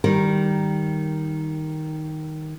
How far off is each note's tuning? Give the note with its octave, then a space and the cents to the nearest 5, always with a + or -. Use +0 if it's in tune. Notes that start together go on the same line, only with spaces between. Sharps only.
D#3 +0 G3 +0 A#4 +0